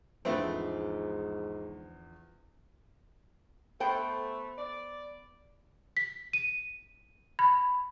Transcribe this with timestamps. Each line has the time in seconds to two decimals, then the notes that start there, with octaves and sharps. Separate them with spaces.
0.25 E2 G#2 D3 F3 A3 B3 C4
3.80 A3 B3 A4 C5 G5
4.58 D5
5.97 B6
6.33 D#7
7.39 B5